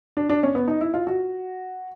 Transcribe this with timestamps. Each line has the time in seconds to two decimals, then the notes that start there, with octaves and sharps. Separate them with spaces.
0.17 D4
0.29 D4
0.43 C#4
0.55 B3
0.68 D#4
0.81 E4
0.94 F4
1.07 F#4